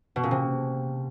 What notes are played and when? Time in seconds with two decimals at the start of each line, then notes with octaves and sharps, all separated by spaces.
0.16 B2
0.23 A#2
0.31 C3